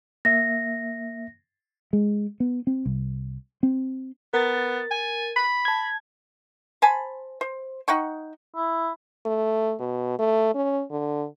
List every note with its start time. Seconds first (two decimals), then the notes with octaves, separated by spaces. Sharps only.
0.25 A#3 E5 A#6
1.93 G#3
2.40 B3
2.67 C4
2.86 C2
3.63 C4
4.34 B3 A#4 A6
4.91 G#5
5.36 B5
5.65 A5 G#6
6.82 C5 G#5 A5 B5
7.41 C5
7.88 D#4 F#5 G5 C#6
8.55 E4
9.26 A3
9.80 B2
10.19 A3
10.55 C#4
10.91 D3